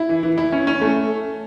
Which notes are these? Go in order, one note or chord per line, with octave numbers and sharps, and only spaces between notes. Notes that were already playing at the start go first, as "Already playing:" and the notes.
Already playing: E4
E3
E3
E4
C#4
C#4
A3